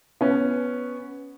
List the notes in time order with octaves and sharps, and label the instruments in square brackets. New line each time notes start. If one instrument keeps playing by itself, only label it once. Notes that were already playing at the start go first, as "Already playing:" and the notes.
[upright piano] B3 C#4